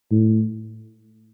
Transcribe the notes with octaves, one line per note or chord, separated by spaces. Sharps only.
A2